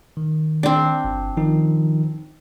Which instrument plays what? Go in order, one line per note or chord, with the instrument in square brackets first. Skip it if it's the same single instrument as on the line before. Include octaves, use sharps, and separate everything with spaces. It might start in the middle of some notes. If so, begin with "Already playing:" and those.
[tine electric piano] D#3
[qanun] C4 D4
[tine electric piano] G1
D#3 F3 D#4